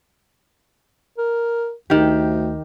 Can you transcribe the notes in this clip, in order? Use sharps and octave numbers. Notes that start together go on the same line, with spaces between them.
A#4
D2 D#3 G4